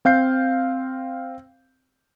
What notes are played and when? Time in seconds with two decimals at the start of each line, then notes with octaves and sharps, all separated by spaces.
0.05 C4 F5 G6 C7